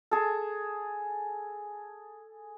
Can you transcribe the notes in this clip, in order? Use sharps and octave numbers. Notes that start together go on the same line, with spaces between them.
G#4 A4